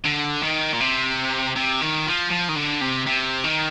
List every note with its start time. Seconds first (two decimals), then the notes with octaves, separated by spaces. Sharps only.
0.06 D3
0.43 D#3
0.73 A#2
0.80 C3
1.56 C3
1.81 D#3
2.06 F3
2.30 F3
2.48 D#3
2.55 D3
2.81 C3
3.06 C3
3.44 D#3